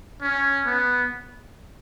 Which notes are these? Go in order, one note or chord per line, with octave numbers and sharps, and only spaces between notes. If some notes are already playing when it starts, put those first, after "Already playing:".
C#4
B3